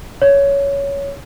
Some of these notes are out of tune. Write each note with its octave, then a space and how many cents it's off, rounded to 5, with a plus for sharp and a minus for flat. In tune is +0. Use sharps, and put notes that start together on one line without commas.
C#5 +15